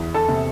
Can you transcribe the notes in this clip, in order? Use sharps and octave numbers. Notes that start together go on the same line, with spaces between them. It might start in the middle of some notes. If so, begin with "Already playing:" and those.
Already playing: E2
A4 A5
C3